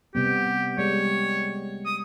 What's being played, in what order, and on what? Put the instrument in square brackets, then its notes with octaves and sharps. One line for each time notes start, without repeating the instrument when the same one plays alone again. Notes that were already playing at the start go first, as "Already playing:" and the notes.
[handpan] C3 G3 B3 [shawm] G4
[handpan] G3 G#3 [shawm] C#5
[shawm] D#6